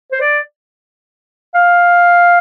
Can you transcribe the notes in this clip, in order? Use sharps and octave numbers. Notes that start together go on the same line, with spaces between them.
C5
D5
F5